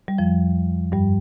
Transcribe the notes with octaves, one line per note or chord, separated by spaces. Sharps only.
G3
F2 F3
G2 G3